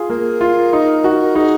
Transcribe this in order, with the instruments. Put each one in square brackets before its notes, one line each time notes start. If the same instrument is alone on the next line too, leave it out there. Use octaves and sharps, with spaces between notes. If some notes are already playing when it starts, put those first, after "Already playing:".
Already playing: [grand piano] F4 G#4
[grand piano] A#3 [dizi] A#4
[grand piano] F4
D#4
F#4
[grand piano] D#4 [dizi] G#4